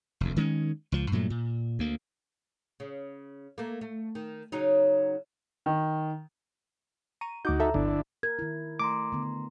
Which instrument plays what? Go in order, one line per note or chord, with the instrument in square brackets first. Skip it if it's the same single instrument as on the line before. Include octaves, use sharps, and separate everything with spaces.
[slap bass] F1 D2
D#3 G#3 B3 C#4
C#2 F3
G2 A#2 F#3 A3
A#2
D2 A#3
[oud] C#3
A3 A#3
A3
D#3
C#3 F#3 D#4
[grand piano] D#3
[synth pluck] A#5 C#6 D#7
[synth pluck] D2 D6 G6 [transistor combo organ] D#4 F#4
[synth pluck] A4 E5 A#5
[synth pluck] G1 [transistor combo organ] D3 D4 E4
[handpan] A#4 [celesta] G#6
[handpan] D#3 E4
[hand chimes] A3 A#5 C6 [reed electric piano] D6
[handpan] D3 B3